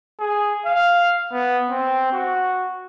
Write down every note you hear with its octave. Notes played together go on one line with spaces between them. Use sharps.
G#4
F5
B3
C4
F#4